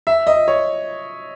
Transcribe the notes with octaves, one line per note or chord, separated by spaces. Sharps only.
E5
D#5
C#5